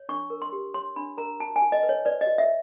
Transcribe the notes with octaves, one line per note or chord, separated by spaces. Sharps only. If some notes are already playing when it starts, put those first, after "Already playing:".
Already playing: C#5
D4 C#6
A#4
C6
G4
C#5 C6
D4 B5
A#4 A#5
F#4 A5
G#5
F#4
D#5
B4
C#5
B4 D5
D#5
F#4
E5